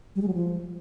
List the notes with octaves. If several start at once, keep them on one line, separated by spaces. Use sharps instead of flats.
G3
G#3
F#3
F3